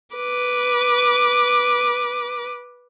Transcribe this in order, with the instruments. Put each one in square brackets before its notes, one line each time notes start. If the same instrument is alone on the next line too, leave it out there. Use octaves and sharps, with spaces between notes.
[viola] B4 D6